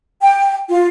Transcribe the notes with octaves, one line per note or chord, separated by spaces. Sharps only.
G5
F4